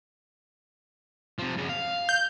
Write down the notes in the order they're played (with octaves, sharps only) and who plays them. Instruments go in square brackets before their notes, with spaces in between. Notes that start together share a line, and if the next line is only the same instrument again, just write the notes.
[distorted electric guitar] C3 F3
F#2 C#3
F5
[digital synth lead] G6